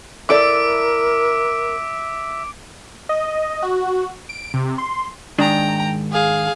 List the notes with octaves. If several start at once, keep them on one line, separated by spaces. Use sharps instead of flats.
E4 A4 A#4 D5 E5 D6 D7
D#5
F#4
D7
C3
C6
G#2 D#3 D4 G5 A#5
G#4 F5